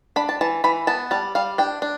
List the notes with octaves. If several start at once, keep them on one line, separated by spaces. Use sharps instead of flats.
D4 B5
A5
E3 A5
E3 B5
B3 A5
G3 A5
G3 F5
D4 G5
D4